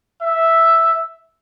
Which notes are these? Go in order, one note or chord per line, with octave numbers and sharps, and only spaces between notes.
E5